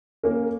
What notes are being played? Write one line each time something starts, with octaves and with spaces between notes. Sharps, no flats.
A#3 C#4 A#4